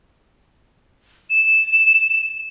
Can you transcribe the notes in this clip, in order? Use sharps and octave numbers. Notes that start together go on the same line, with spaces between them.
E7